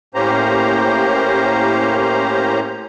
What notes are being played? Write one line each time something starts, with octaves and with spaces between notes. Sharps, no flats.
A2 A#3 C#4 G4 C5 A#5